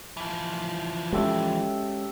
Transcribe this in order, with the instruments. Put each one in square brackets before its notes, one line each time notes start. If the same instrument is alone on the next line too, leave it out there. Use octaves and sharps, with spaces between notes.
[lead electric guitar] E3 F3
[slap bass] G#3 C#4 [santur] G4 A4 E5